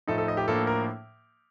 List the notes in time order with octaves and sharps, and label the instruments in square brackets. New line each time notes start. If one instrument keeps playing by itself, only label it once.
[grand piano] A2 F3 A3 D#4 A4
A4
D#5
G4
A2 F3 A#3 D4 A4
A#4